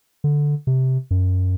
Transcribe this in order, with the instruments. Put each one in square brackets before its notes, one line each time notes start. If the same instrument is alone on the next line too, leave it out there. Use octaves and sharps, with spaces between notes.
[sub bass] D3
C3
F#2